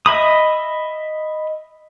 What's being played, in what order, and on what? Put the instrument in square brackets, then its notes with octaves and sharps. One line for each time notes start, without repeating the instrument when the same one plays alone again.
[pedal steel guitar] D#5 E5 B5 D#6